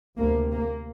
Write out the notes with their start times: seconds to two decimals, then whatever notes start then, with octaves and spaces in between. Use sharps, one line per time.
0.17 D2 C3 A#3
0.51 A#3